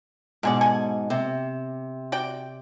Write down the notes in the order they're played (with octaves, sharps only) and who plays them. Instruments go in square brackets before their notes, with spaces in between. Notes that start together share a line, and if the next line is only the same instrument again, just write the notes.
[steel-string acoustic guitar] G#2 B2 [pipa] D4 G#4 D5
[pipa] A4 G#5
[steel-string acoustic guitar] C3
[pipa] F#4 D5 G5